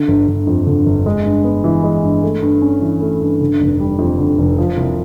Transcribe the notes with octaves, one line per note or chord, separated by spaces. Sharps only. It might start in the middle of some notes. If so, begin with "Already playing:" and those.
Already playing: D3
G1
G1
F2
D3
G1
G#3
G2
B3
E3
G#3
G2
A3
G2
C#4
E3
A3
G2
D3
F1
G3
F2
D3
F1
F3
C2